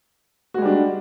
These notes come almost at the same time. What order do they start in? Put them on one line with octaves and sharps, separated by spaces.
F#4 G#3 G3 D4